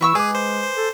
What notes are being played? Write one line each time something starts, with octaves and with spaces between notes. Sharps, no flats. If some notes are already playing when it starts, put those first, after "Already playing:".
E3 E4 C#6 E6
G#3 G#4 B4 G#5 D6
C5
C5
A4